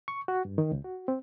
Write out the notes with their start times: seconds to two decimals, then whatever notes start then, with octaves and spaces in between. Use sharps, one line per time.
0.08 C#6
0.28 F#4
0.45 G2
0.58 D#3
0.72 C#2
0.84 F#4
1.08 C4